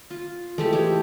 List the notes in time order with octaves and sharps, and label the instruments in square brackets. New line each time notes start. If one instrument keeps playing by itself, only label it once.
[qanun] F4
[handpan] E3 A4 [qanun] G#3 A3 G4
[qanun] G4 C#5